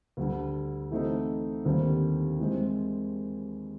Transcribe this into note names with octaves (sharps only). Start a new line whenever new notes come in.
D2 D3 G3
E3 A3 C4 D#4
D#2 D3 G3 C4
E3 G#3 C4